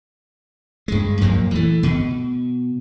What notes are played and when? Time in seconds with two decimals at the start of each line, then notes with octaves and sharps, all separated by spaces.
0.88 G2 G#3
1.21 F2 A#2 F#3 A#3
1.51 E3 A3
1.83 B2